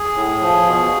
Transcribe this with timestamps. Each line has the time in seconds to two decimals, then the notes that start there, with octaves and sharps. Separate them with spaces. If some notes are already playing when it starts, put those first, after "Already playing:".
Already playing: G#4
0.16 A2
0.42 F3
0.66 B2